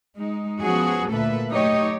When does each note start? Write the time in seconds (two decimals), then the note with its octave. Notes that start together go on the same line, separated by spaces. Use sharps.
0.15 G#3 D#4
0.60 F3 B3 C#4 F#4 G#4
1.09 D2 A#2 A#3 A4 B4 E5
1.50 F#3 A3 D#4 G4 C#5 D#5